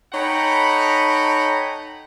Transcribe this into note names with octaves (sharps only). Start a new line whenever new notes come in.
D#4 A4 C#5 F#5 G5 B5